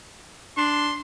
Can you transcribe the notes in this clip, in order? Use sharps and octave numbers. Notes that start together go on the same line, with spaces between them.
D4 C6